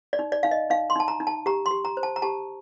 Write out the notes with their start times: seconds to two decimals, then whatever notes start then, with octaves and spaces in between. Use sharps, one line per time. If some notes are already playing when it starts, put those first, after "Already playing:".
0.13 D5
0.19 D#4
0.32 D5
0.43 D#4 F5
0.51 D#5
0.70 D#4 F5
0.90 C6
0.96 D#4 A5
1.08 A#5
1.20 D#4
1.27 A5
1.46 G4 A#5
1.66 C6
1.71 G4
1.85 A#5
1.97 C5
2.03 A5
2.16 A#5
2.22 G4 A5